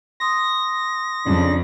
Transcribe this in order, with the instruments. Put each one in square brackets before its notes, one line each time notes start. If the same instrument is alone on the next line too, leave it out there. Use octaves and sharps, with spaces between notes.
[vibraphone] C6 D#6 [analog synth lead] A#6
[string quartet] F2 [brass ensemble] C#3 D4